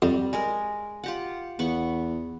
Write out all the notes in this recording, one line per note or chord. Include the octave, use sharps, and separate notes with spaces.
F2 G3
G#3 G#4 A#4
F4 G4 F#5
E2 B3 F#5 C#6